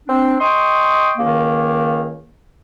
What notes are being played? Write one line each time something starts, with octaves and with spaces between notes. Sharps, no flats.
C4 D4
D#5 G5 C6 C#6 D#6
C#2 D#3 A#3